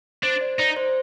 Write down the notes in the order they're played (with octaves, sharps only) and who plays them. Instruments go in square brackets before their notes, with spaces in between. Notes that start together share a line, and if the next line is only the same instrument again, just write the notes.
[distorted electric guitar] D4 [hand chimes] C5
[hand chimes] D5
[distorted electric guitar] D#4 [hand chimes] D5
[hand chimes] C5